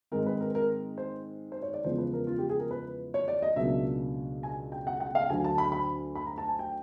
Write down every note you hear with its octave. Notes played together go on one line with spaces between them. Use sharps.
G#2 D#3 G#3 C4 A#4
B4
A#4
A#4
C5
C5
C#5
D5
E2 C#3 F3 G#3 B3 C5
B4
A#4
F4
G4
G#4
A#4
B4
C#5
D5
D#5
C#2 B2 F#3 A#3 D4 E5
G#5
G5
F#5
F#5
F5
D2 D3 F#3 G#5
A5
B5
B5
B5
A#5
A5
G#5
G5